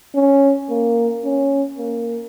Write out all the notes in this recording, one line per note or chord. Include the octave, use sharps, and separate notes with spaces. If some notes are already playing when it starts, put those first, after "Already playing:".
C#4
A#3
C#4
A#3